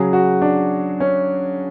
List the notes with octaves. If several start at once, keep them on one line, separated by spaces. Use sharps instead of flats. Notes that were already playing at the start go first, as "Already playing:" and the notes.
Already playing: C#3 F#3 G#4
F#4
D4
C#4